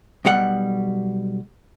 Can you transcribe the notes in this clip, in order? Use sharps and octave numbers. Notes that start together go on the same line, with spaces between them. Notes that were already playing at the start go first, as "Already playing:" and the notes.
B1 B2 G3 F#5